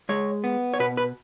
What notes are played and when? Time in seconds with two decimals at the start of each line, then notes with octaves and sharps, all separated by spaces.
0.09 G#3 C#5
0.44 B3
0.74 C#5
0.80 B2 B4
0.97 B4